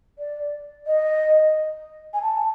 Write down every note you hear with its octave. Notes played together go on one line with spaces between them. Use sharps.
D5
D#5
G#5
A5